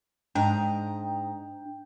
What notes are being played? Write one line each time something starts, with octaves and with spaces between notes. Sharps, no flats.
G#2 D4 D#5 G5 A#5